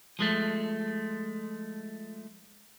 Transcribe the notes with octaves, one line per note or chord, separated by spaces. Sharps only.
F3 G#3 A3